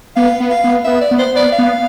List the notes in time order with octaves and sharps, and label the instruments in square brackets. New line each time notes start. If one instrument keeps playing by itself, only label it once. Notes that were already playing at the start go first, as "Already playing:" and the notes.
[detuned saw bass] B3 [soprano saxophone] F5
[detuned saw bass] B3
[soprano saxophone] F5
[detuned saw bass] B3
[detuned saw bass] B3 [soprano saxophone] E5
[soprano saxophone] D5
[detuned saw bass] B3
[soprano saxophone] C5
[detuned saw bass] B3 [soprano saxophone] D5
[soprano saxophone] F5
[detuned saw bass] B3